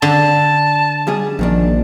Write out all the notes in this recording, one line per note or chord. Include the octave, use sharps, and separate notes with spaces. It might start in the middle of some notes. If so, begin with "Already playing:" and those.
D3 A5
F#2 G3 G#4
A#1 F#2 D#3 D4